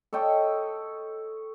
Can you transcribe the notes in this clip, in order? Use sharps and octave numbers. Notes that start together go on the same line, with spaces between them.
A4 C#5 D#5 G5